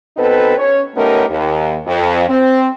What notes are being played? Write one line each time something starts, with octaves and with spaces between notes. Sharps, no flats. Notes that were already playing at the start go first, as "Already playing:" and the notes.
B2 B3 C4 D#4 A4 B4
C#4 C#5
A3 B3 C#4 D#4 G4 A#4
D#2
F2
C4